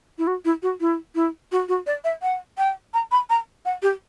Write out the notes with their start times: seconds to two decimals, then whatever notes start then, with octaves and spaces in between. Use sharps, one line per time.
0.18 E4
0.27 F#4
0.45 E4
0.63 F#4
0.81 E4
1.15 E4
1.52 F#4
1.69 F#4
1.87 D5
2.04 E5
2.22 F#5
2.58 G5
2.94 A#5
3.12 B5
3.30 A#5
3.65 F#5
3.82 G4